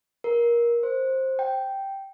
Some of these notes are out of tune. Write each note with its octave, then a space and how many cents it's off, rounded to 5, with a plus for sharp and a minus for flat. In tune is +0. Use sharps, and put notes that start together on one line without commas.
A#4 +20
C5 +15
G5 -5